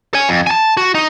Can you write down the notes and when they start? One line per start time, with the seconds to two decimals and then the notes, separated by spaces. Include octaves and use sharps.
0.14 C#5 G#5
0.29 F2
0.47 G#5 A5
0.77 F#4
0.95 D#4